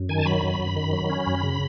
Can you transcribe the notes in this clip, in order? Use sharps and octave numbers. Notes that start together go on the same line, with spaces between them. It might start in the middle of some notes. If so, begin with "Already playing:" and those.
Already playing: F#2
D#3 G#5
A5
F#3 B5
F#2
F#2
D#3
F#3
C#4
F#2
C#3